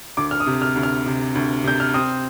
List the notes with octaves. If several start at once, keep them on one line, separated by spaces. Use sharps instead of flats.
D2 D6
F6
D#6
C3
F6
D2
F6
C3
D2
C3 G6
F6
C4 D#6